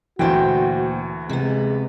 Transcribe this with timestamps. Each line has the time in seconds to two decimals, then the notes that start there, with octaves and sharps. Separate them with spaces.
0.19 D2 A#2 E3 F#4 C5 G5
1.29 C3 G#3 B3